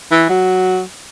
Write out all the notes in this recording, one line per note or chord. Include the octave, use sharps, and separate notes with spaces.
E3
F#3